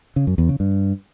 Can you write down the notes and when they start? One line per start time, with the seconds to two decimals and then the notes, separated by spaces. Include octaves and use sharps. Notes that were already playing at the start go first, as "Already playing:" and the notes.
0.16 C#3
0.27 F#2
0.38 E2
0.49 C#3
0.60 G2